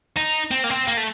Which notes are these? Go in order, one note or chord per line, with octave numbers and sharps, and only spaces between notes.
D#4
C4
A#3
C4
A#3
A3